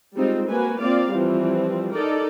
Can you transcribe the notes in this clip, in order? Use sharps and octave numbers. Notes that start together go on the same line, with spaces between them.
G3 G#3 C4 D#4 F4
A#3 F#4 B4 G#5
A#3 C4 F4 D5 F5
E3 F3 G3 C4
D#4 A4 A#4 D5